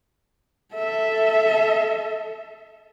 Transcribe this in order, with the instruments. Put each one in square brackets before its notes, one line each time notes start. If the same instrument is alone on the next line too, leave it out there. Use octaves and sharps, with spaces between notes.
[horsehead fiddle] A4 E5